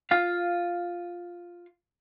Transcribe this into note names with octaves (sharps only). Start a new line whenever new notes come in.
F4 F5